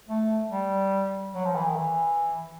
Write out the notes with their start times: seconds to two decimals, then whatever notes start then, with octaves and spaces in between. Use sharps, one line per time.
0.08 A3
0.51 G3
1.34 F#3
1.45 F3
1.55 E3
1.66 D#3
1.76 E3